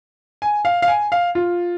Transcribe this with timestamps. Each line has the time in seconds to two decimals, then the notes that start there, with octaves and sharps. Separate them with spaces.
0.42 G#5
0.65 F5
0.82 F5
0.88 G#5
1.12 F5
1.35 F4